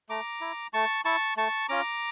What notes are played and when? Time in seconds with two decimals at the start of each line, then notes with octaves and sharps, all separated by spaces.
0.09 A3 A#5 D6
0.41 E4
0.73 A3 A5 C#6
1.05 E4 A5 C#6
1.37 A3 A5 C#6
1.69 C#4 F4 A#5 D6